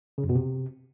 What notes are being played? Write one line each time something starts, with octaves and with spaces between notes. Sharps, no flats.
C#3
F#2
B2
C3